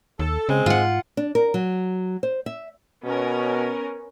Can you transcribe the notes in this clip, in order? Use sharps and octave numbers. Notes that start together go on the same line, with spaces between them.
D#2 A4
C#3 G#3 C4
G#2 F4 F#5
D4
A#4
F#3
C5
E5
B2 B3 C#4 A#4